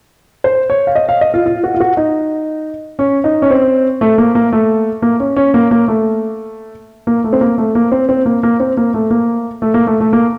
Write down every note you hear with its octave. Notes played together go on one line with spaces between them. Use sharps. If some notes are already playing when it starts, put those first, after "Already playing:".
C5
C#5
F5
D#5
F5
D#5
F4
F4
F#4
F4
F#4
D#4
C#4
D#4
C#4
C4
A3
A#3
A#3
A3
A#3
C#4
C#4
A#3
A#3
A3
A#3
A3
C4
A#3
A3
A#3
C4
C4
A#3
A#3
C4
A#3
A3
A#3
A3
A#3
A3
A3
A#3